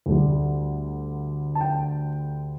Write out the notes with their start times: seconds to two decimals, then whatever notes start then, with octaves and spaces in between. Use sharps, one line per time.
0.06 D2 D3 G3
1.55 A5
1.61 G5